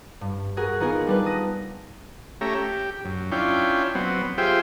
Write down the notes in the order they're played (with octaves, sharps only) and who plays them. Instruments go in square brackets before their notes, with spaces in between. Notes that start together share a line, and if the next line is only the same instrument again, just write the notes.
[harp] G2
F#4 G#4 A#4
A#3 B3 D#4 F4 G#4 A#4
G3 D4 B4
D#6 A#6
[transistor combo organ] A3 C#4 G4 E5 A#5
G4
F#2
C#4 D4 E4 F4 G5
F#3 B3 C4
F4 G4 G#4 C5 E5 G5